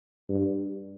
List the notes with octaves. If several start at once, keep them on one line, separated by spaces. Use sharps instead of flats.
G2